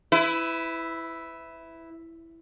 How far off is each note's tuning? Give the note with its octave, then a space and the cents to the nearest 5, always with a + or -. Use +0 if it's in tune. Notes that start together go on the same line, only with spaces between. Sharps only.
E4 +0 B4 +30